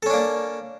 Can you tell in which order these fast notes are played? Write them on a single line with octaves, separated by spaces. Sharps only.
A4 C#4 D4 A#3